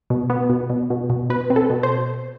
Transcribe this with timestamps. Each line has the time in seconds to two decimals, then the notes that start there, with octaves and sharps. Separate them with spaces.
0.10 B2
0.30 B3
0.50 B2
0.70 B2
0.90 B2
1.10 B2
1.30 B2 B4
1.50 C4
1.56 A4
1.70 B2
1.83 C5